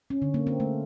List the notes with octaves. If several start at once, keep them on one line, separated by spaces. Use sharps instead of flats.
C#4
D3
A#3
C4
A3